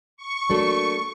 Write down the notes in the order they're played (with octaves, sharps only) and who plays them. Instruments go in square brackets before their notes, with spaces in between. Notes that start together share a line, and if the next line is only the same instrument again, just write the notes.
[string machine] C#6
[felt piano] F#3 [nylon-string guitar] A3 A#3 D4